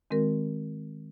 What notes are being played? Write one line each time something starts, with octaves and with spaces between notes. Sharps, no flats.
D#3 G#3 C4 F#4 A#4